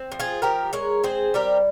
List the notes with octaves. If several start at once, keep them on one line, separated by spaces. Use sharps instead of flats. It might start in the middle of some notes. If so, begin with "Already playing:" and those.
Already playing: C4
F3
F4 G#4
F3 G4 A#4
G#3 A#4 C#5
C4 G#4 C5
G3 G4 A#4